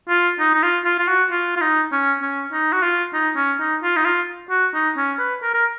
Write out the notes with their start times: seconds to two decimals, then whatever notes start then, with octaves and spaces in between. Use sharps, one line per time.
0.09 F4
0.40 D#4
0.54 D#4
0.63 F4
0.85 F4
0.99 F4
1.08 F#4
1.31 F4
1.56 F4
1.61 D#4
1.92 C#4
2.22 C#4
2.53 D#4
2.73 F#4
2.83 F4
3.14 D#4
3.36 C#4
3.60 D#4
3.83 F4
3.96 D#4
4.05 F4
4.50 F#4
4.74 D#4
4.97 C#4
5.19 B4
5.43 A#4
5.54 A#4